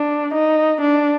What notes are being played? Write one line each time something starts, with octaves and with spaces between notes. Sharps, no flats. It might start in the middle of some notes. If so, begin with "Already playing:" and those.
Already playing: D4
D#4
D4